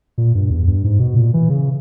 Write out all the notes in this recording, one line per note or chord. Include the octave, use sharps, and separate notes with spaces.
A#2
G2
E2
G2
G#2
B2
A#2
E3
C#3